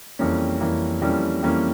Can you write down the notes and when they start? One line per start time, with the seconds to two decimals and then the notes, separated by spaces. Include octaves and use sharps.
0.19 F2 E3 G3 A#3 C#4
0.60 F2 E3 G3 A#3 C#4
1.02 F2 E3 G3 A#3 C#4
1.43 F2 E3 G3 A#3 C#4